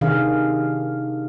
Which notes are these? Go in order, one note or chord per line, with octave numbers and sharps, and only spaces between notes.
C3 D#3 D4 G#4 F5